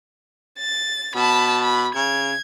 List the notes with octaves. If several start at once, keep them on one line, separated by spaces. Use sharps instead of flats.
A6
B2 A5 B5
B5
C#3 G#6